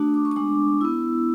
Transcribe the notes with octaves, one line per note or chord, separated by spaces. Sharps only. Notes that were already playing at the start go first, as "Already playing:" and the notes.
Already playing: A3 D4 F#4 D#6
D6
C#6
D#6
G#3 B3 D4 D6
B3 E4 E6